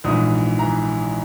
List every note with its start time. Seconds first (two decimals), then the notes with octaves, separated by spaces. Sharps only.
0.04 A#1 G#2 E3 D#6
0.59 E3 A#5